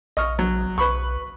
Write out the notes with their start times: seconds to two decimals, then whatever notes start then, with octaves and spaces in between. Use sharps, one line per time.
0.17 A#1 D#5 C#6 F6
0.39 F#3
0.78 B1 B4 B5 C#6